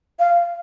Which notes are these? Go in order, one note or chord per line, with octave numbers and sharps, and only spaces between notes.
F5